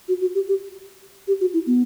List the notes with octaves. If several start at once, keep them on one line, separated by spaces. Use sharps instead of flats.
F#4
F#4
G4
G4
G4
F#4
E4
B3